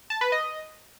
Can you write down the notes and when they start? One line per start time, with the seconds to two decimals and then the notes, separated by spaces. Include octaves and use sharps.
0.10 A5
0.21 B4
0.32 D#5